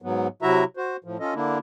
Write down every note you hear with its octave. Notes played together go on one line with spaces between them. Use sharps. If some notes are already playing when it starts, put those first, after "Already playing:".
G#2 F#3 B3
C3 F#3 E4 F#4 E5 A#5
F#4 C5
A2 F3
C#4 F4 A4 D#5
D3 A#3 D4 E4